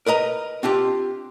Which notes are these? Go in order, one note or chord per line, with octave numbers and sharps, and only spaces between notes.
A#4 B4 D#5 A#5
C4 D4 F4 G4